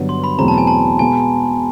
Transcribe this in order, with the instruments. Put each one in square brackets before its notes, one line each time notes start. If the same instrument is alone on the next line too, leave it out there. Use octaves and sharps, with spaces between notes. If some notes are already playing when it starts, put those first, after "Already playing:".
Already playing: [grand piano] G2 D3 F#3 B3
[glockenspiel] C6
B5
[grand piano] E2 B2 F#3 A3 C4 [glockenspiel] A#5
[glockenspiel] A5
G#5
A5
[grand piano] B2 G#3 B3 [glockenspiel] G#5